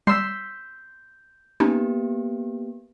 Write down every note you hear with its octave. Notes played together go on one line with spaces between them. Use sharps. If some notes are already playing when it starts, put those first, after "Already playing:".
G3 C6 E6 G6 B6
A#3 B3 C#4 D#4 G4